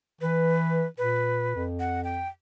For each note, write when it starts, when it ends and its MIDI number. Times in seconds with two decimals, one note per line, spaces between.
0.21 0.85 52
0.21 0.86 71
0.98 1.51 46
0.98 1.63 71
1.56 2.28 41
1.80 2.03 78
2.04 2.28 79